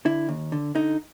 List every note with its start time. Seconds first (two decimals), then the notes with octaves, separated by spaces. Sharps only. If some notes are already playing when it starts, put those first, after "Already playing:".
0.05 D3 E4
0.29 D#2
0.52 D3
0.75 D3 D#4